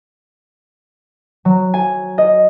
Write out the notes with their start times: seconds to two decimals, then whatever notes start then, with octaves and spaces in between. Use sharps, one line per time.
1.45 F#3
1.74 G#5
2.18 D#5